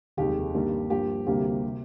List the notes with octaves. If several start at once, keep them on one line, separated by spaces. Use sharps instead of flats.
F1 D#2 D#3 G#3 G4
G2 D#3 G3 A#3
G2 F3 A#3 G4
D2 C3 G3 A#3 G4
C3